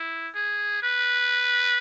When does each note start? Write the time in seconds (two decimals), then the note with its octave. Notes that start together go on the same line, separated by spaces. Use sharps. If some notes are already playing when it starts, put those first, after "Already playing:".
Already playing: E4
0.35 G#4
0.82 B4